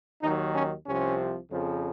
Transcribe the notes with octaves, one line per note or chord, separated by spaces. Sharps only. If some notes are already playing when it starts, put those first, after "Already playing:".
D#2 D#3 F#3 D#4
C#4
C2 C3 F3 C#4
F2 C#3 F3